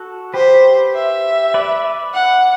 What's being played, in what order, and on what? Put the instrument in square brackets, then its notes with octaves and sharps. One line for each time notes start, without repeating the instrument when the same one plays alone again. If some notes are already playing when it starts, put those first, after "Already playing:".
Already playing: [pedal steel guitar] F#4 A4
[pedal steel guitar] G4 B4 [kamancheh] C5
[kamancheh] E5
[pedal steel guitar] B4 D5
[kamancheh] F#5